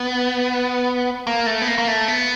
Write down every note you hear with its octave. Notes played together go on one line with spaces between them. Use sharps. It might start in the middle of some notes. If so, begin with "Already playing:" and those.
Already playing: B3
A#3
A3
B3
A#3
A#3
A3
B3